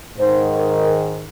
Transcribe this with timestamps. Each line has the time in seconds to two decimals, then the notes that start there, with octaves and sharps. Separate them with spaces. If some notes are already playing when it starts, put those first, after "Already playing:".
0.17 G#2 D#3 C5
0.57 A#4